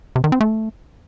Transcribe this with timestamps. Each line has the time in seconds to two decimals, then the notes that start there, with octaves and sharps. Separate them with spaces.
0.16 C3
0.24 D#3
0.32 C4
0.41 A3